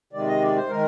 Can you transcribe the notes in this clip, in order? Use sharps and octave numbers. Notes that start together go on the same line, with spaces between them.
C3 D#3 G#3 D5
D#5
D5
C5
D#3 G#3 A#4